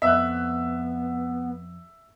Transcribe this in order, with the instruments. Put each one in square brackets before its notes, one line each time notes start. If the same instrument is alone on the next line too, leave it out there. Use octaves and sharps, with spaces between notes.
[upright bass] F2 [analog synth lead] B3 [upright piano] E5 F#6